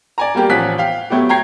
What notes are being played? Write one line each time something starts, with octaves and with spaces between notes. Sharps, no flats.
D5 G#5 A#5
G3 A#3 G4
A1 F3 G#5 F#6 B6
F5 G5
F#3 A3 B3 G4
G5 A#5 G#6 C7